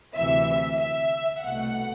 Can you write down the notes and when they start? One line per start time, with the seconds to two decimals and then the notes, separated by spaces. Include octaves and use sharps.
0.16 D2 C3 E3 E5
0.81 E5
1.44 C2 B2 A3 F#5